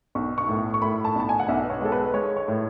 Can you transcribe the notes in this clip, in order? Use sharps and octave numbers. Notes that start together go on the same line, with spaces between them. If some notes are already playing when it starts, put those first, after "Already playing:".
B1 C#6
C#6
A2
C#6
A2 B5
A5
B1 A5
G#5
F#5
B1 E5
B4
C#5
G#3 A4
B4
G#3 C#5
C#5
A2